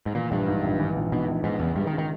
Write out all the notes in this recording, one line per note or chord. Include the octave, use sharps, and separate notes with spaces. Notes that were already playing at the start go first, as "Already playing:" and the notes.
G#2
A#2 E3
A#1 G2
G#2
A#1
E3
A#1
G#2 B2
A#1
G#2 B3
E2 C#3
G2 G#3
D#3
C#3
D#3